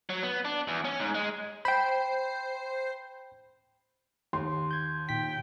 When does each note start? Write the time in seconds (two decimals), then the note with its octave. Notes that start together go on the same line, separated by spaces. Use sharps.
0.10 F#3
0.23 B3
0.45 D4
0.68 E2
0.85 C#4
1.00 G#2
1.15 G#3
1.65 C5 G5 B5
4.33 D#2 C6
4.71 G6 G#6
5.09 A#2 D#4 G5 B6